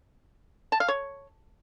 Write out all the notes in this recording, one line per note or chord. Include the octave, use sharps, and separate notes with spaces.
A5
F5
C#5